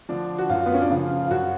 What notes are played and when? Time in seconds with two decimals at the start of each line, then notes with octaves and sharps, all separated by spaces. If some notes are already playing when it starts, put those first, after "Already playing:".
0.09 D3 F3 D4
0.38 F#4
0.49 F#2 F4
0.66 B3
0.74 C#4
0.81 D4
0.90 C#3 F3 F4
1.25 F4
1.30 F#2 F#4